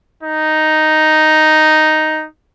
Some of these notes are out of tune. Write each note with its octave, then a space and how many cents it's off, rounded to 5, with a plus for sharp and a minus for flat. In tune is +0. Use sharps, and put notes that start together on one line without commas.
D#4 +0